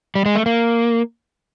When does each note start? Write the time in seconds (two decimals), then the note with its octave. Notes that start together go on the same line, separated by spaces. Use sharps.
0.15 G3
0.26 G#3
0.35 A3
0.46 A#3